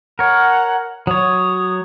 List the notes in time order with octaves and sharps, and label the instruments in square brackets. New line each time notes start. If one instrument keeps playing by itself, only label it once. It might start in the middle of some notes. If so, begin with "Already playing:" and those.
[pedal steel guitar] A#4 C#5 [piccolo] F#5
[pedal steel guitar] F#3 C#5 [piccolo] D#6